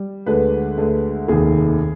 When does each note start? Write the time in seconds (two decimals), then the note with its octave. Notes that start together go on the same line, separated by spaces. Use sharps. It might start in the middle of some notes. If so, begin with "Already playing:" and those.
Already playing: G3
0.26 D2 D3 G#3 B4
0.78 D2 D3 G#3
1.28 F1 D#2 D#3 G#4